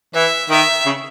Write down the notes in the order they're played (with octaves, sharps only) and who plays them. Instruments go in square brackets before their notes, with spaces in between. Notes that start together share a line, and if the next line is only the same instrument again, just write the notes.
[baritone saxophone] E3 [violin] E5
[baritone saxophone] D#3 [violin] E5
[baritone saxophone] C#3